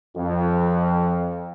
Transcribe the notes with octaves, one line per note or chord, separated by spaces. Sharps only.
F2